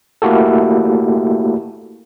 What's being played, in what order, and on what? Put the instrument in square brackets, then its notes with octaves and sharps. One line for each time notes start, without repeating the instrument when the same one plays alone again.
[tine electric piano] A3 A#3 E4 F#4 G4 A4